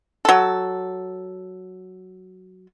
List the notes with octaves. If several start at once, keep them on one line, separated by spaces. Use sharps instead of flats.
F#3 A4